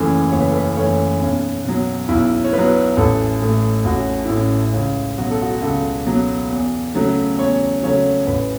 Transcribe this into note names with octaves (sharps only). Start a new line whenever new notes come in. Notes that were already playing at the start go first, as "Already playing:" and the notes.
Already playing: F#1 F#2 E3 A3 C#4
F#1 C#5
B4
A4
B4
F#2 E3 A3 C#5
B1 C#4
B2 F#3
B1 E4
C#5
B2 F#3 B4
A1 A4
A2 A3
A1 F#4
E4
A2 A3 C#4
C#2 C#4
B2 F#3 F#4
A4
F#4
C#2 A4
B2 F#3
E2
C#3 F#3 A3
E2 C#5
C#3 F#3 A3 C#5
A1 B4